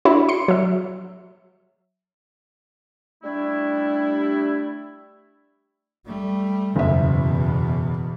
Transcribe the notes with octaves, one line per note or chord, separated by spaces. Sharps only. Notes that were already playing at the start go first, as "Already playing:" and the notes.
D4 E4 F#4 C#5
C6 C#7
F#3 E5
G3 A3 D4 E4
G3 A3
F#1 E2 B2 E5